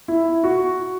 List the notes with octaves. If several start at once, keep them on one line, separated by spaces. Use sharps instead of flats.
E4
F#4